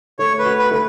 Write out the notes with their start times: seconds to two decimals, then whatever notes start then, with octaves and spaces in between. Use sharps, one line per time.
0.19 A3 C#5
0.39 B4
0.45 F#4
0.59 B4
0.71 A3 B4